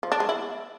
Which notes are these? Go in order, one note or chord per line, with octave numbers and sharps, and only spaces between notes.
F3
D4
G#3
E4